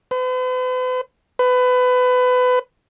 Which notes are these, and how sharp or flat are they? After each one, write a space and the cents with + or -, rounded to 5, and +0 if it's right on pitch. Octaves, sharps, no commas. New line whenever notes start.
B4 +45
B4 +25